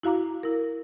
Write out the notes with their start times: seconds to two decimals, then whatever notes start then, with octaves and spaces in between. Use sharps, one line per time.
0.03 E4 F#4 F5 A#5 D6
0.43 E4 A#4